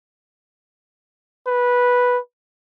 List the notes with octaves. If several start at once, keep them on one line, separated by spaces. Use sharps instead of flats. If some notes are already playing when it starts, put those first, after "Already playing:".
B4